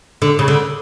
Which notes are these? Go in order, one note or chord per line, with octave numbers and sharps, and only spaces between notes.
D3
C#3
D3